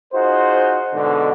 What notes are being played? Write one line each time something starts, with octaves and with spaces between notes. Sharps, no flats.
D#4 F4 F#4 G#4 C5
G#2 B2 D3